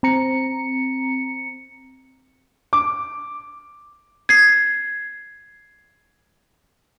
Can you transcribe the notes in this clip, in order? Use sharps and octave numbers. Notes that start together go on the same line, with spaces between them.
C4 A#5 C#7
D6
G#6 C7